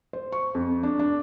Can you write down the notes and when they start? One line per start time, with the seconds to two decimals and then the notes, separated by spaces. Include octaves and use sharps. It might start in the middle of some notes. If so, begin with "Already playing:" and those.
0.13 C5
0.32 C#6
0.55 F2
0.83 D4
0.99 D4